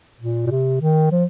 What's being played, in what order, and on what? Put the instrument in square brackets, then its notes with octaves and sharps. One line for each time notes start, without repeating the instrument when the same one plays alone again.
[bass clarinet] A#2
A#2
C3
D#3
F3